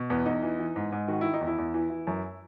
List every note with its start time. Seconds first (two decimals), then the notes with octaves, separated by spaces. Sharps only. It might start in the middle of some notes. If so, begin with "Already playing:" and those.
Already playing: B2
0.10 E2 B3
0.26 E2 D#4
0.43 E3
0.59 E3
0.76 G#2
0.92 G#2
1.08 D#3 F#4
1.21 D#3 E4
1.34 D#4
1.41 E2
1.47 E4
1.58 E2
1.74 E3
1.90 E3
2.07 F#2